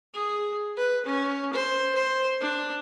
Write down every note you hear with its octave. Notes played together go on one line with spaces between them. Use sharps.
G#4
B4
C#4
C5
C5
D4